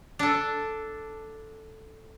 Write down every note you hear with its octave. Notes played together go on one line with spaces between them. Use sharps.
D4 A4